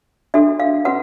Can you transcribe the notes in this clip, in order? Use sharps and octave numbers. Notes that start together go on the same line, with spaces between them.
D4 F#4 A4 E5
F5
C#4 F#4 B4 F#5